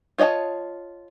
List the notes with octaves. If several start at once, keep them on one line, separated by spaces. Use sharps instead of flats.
F4 C#5 D#5 F#5 A5